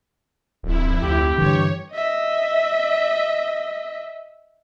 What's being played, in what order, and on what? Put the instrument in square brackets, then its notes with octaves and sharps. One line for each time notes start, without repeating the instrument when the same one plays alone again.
[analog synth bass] D1 [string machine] F2 E4
[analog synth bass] D2 [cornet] G4
[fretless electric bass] G2 D3 [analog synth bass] E3 [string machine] C#5
[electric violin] D#5 E5